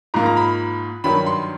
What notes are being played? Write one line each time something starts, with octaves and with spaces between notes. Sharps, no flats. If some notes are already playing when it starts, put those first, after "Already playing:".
G#2 F3 A#3 A#5
A#5
B5
G2 D#3 F#3 B5
C6